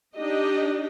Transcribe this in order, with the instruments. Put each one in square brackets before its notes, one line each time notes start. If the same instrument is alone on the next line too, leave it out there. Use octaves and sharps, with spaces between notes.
[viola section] D4 D#4 G4 D#5